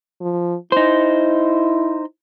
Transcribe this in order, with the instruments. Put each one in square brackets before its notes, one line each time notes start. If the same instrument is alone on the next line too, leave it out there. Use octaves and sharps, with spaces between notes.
[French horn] F3
[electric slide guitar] D#4 C5 [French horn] E4